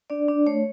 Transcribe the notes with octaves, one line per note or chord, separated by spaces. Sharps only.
D4 D5
D4
A3 C#5